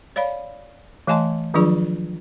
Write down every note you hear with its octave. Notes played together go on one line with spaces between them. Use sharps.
C#5 D5 F5 B5
E3 A3 D#5 G#5 A5 C6
D#3 F3 F#3 D4 F4 G#4